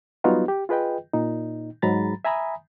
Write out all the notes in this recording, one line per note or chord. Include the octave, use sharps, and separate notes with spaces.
F#3 G3 B3 D#4 F4 F#4
G4
F4 G#4 B4 D#5 G5
A#2 D#4
G#2 F#3 A#5 B5 A6
E5 G#5 A#5 B5 D#6